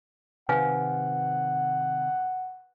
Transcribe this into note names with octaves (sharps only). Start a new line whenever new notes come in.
C3 D#3 B4 F5 F#5 G#5